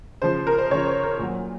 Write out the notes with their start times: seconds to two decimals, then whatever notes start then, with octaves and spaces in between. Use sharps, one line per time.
0.22 C#3 F3 C5
0.47 A#4
0.58 C5
0.70 C#3 F3 C#5
0.87 C5
1.03 A#4
1.19 A#2 F#3